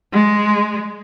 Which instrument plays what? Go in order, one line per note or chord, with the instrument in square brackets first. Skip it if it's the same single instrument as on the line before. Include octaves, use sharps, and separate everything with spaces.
[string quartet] G#3